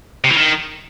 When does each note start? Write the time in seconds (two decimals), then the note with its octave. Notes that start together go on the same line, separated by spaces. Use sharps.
0.24 C3
0.31 E3
0.37 D#3